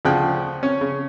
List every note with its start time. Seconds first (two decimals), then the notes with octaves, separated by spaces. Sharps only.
0.05 D2 C#3 F3 G5 F#6
0.63 C#4 C#5
0.81 C#3